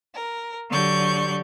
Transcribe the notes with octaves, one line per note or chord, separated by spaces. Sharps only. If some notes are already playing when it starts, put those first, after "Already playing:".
A#4
D3 F#3 G4 D5 C#6 G6